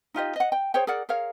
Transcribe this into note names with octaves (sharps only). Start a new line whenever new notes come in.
D#4 F4 G4 D#5
D#5 F#5
G5
G#4 C5 C#5 G5
G#4 A#4 D5 F#5
G#4 A#4 C#5 F5